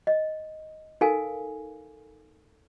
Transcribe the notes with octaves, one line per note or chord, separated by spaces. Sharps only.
D#5
D#4 A4 A#4 F5 G#5